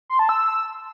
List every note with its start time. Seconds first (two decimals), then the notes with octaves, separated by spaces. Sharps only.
0.10 C6
0.19 A5
0.29 E6